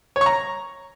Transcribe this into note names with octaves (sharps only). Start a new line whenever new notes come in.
C#5
C#6
A#5